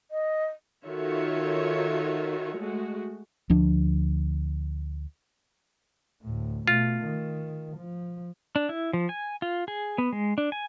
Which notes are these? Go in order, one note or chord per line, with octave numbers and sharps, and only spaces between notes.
D#5
D#3 F4 F#4 A4 C#5 E5
G#3 A3 F#4
D2 F3 D4
D2 A2
B2 A3 F4
D#3
F3
D4
E4
F3
G#5
F4
G#4
B3
G#3
D4
G#5